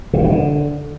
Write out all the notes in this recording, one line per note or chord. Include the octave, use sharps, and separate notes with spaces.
C3
A#2
D#3
D3